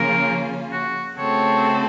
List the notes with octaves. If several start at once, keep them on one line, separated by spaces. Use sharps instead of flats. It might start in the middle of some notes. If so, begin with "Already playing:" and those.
Already playing: C#3 F3 A#3 C#4 F4 A#4
F#4
C#3 A3 C4 F#4 A4 C#5